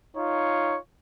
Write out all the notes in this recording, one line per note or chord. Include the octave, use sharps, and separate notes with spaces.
D#4 F4 C#5